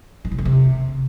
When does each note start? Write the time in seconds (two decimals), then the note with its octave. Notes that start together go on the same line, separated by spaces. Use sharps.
0.25 G#2
0.32 B2
0.39 F2
0.45 C3